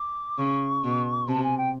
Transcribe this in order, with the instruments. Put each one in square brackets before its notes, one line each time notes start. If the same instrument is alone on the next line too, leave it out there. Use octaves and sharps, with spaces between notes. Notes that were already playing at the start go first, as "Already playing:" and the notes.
Already playing: [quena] D6
[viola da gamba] C#3 [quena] C#6
[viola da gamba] B2
[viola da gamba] C3 [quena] A5
[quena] G#5
G5